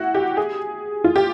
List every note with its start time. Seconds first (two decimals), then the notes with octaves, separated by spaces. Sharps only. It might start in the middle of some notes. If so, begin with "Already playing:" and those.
Already playing: E4 F#4
0.15 G4
0.37 G#4
1.04 F4
1.16 G4